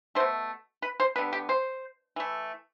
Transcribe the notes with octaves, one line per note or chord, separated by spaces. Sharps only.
B2 A3 C5
B4
C5
D3 G3 B3 B4
G4
C5
E3 A3